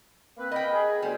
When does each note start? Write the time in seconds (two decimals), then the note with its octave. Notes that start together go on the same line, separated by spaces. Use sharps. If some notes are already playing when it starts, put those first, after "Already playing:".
0.38 A#3 C4 B4
0.51 A#4 D#5 G5 B5
0.73 G#4
1.02 D2 G3 B3 C5